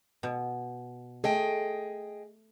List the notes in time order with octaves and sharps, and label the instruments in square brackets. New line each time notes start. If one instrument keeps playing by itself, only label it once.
[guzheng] B2
[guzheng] A3 [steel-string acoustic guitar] G#4 D#5 G5